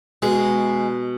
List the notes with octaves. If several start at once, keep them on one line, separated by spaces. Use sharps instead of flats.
B2 G#3